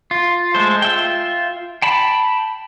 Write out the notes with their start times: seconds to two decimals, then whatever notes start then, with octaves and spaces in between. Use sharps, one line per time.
0.11 F4
0.55 G#3 A3 A4 C5
0.82 F4 E5 G5
1.82 G5 A5 B5